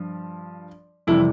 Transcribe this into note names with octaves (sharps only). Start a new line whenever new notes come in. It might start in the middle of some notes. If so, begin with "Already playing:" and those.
Already playing: G2 F3
F2 C3 E3 G3 E4